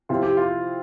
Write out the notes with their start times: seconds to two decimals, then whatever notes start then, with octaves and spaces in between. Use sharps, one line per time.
0.09 C3 F3 C4 E4 F4
0.23 G4
0.37 F4